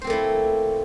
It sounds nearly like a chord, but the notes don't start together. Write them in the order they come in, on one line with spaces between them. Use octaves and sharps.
C5 C4 A#3 A3 E4